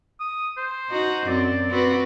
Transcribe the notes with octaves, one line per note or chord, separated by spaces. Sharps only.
D#6
C5
D#4 F#4
F#2 C4 D5
C4 F#4 B4